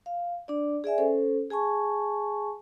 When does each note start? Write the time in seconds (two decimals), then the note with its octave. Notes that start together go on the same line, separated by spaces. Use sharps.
0.06 F5
0.48 D4 D5
0.84 G#4 D5 E5 G#5
0.98 C#4 A4 C5
1.50 G#4 G#5 A5 C#6